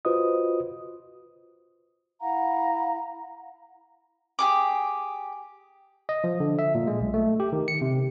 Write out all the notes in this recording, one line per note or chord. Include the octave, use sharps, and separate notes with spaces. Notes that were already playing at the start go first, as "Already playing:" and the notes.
F4 F#4 B4 C5 D#5 D#6
E4 F5 F#5 A#5
G4 G#4 D6
D#5
F3
D3
E5
A#2
G#3
B1
A3
G4
D#3
C#7
C3